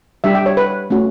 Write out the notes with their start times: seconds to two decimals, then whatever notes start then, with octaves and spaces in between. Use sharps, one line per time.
0.24 G3 D4 G4 E5
0.35 G5
0.46 C#5
0.57 B4
0.90 A3 C#4 F#4